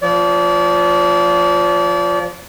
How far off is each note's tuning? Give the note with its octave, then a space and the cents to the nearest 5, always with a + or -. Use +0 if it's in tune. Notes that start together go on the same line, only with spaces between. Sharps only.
F3 +0 D5 -35